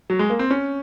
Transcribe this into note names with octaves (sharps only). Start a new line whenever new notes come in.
F#3
G#3
A#3
C4
C#4